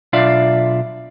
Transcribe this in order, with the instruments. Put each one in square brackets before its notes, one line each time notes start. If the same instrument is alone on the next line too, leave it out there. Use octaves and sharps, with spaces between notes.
[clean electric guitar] B1 D4 F4 D5 E5 F5